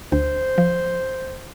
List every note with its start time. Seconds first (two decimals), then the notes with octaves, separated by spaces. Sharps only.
0.12 D2 C5
0.58 F3